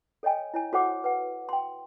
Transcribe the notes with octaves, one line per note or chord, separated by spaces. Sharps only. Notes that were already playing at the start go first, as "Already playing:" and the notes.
A4 C#5 D#5 G5 G#5
E4 C#5 G#5
F#4 A4 C5 C#5 F#5 D6
B4 F#5
G5 C6